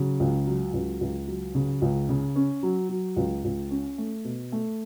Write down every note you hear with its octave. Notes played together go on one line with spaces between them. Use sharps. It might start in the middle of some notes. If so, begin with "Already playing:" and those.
Already playing: C#3 F#3
C#2
F#3
C#2
C#2
F#3
C#3
C#2
C#3
C#4
F#3
F#3
C#2
C#2
C#4
A3
B2
A3